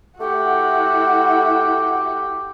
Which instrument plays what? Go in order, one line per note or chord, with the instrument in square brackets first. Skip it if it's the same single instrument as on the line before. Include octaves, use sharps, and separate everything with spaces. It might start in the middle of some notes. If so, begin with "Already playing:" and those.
[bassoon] A3 [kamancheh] E4 F#4 [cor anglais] G4 [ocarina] F#5